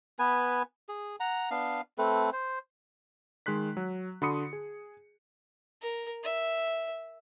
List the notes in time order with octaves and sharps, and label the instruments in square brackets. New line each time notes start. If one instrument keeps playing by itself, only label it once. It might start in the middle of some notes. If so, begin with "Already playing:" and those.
[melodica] B3 B4 G#5
G#4
F#5 A#5
B3 D4 F5
A3 C4 A4 B4
C5
[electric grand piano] D#3 G#3 C6 F#6 B6
F#3
D3 F#4 B5 C6 D#6 C#7
G#4
[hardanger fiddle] A#4
E5